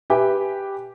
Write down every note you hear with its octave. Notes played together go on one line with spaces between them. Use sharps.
G4 B4 E5 G5 G#5